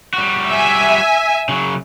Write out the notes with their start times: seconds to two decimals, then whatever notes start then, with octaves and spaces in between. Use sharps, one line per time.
0.14 G3 F#4
0.49 E5 G#5
1.49 C#3 F#3